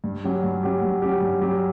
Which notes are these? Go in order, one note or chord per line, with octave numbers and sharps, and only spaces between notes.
G2
F#3 C#4 G4
G2
F#3 C#4 G4
G2
F#3 C#4 G4
G2
F#3 C#4 G4